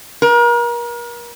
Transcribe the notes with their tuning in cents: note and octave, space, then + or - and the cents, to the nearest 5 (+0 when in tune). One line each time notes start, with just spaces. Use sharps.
A#4 +35